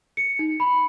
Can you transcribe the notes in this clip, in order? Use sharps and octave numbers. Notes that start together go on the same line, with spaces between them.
C#7
D#4
B5